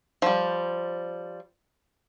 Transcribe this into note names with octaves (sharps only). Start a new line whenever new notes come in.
F3 G3